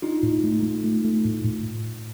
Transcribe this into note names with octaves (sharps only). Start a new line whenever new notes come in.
D4 D#4 F4
A2
A3
A3
A3
A3
A2
A2